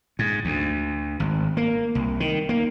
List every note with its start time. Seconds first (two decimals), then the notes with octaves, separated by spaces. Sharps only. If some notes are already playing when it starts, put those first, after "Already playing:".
0.19 G#2
0.45 D2
1.20 G#1
1.57 A#3
1.95 C2
2.20 D#3
2.49 A#3